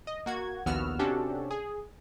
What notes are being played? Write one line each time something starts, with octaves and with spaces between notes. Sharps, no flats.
D#5
A#3 F#4 G#6
A#1 D#2 B3 F#4 E6 F6
C3 C#4 D4 F#4 G4 A4
G#4